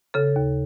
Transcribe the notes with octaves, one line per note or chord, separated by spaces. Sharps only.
C#3 A4
D#2